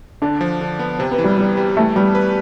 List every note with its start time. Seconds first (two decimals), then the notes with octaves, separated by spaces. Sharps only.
0.22 D3 D4
0.41 F3
0.61 D3
0.79 B3
0.99 C3 C4
1.11 B3
1.18 E3
1.24 G3
1.37 G3 B3
1.57 G3
1.77 E3 A3
1.96 G3 B3
2.15 B4